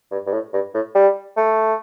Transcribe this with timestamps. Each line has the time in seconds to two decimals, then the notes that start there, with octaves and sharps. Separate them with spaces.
0.11 G2
0.26 G2
0.33 A2
0.53 G2
0.74 A2
0.95 G3
1.37 A3